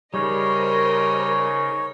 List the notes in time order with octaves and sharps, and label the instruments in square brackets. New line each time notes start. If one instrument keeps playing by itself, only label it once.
[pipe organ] C#3 D#4 G#4 [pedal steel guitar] G3 [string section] A#4 C5 D#5 [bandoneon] C#5